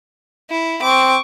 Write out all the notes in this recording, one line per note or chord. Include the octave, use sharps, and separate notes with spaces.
E4
C4 C#6 D6